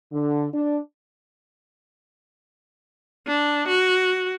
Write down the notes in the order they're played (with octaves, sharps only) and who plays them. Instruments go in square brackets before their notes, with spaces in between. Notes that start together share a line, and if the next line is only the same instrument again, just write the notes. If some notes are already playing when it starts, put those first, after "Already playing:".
[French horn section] D3
D4
[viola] D4
F#4